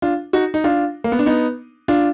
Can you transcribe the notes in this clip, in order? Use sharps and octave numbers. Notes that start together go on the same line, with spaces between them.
D4 F4
D#4 F#4
D#4
D4 F4
A#3
B3
D4
B3 D#4
D4 F4